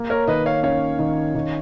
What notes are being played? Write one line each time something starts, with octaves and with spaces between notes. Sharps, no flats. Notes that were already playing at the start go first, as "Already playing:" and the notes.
Already playing: A#3
A#4 C#5
D#3 B4 D#5
C#5 F5
C#4 C#5 F5
D#3
D#3